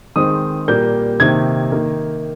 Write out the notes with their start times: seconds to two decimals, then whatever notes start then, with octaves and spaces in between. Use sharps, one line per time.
0.16 D#3 G#3 C4 D#6
0.68 A#2 G3 A#3 G6
1.20 C3 D#3 A#3 G#6
1.72 D#3 A#3